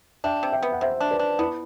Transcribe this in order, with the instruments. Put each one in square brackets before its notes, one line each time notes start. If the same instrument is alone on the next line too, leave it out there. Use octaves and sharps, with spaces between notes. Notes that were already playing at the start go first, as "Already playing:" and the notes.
[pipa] D4 [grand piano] E5 G5
[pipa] C3
[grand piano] E5 G5
[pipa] B3
[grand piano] F#5
[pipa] C3 [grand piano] C5 E5
[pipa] D4
[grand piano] B4 D5
[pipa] D4
[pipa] B3 [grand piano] E4